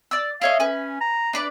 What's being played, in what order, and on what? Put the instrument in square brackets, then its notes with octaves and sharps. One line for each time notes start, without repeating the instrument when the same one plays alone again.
[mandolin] D5 D6 E6
[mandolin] E4 C#5 D#5 [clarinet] F5
[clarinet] C#4 [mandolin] B4 G#5
[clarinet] A#5
[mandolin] D4 B4 D5